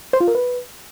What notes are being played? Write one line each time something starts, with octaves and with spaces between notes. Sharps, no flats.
C5
F4
A#4
B4